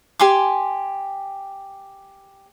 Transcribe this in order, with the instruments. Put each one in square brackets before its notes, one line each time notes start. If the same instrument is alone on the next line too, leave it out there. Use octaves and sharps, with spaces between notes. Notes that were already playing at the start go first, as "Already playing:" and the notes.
[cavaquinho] G4 G#5 C6 D6